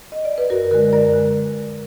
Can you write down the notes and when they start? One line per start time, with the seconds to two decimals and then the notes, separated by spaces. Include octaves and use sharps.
0.12 D#5
0.25 D5
0.38 B4
0.50 F#2 F#4 A#4
0.71 D3 G#3 A#4 D5
0.93 F#2 A#4 D5
1.13 D3 G#3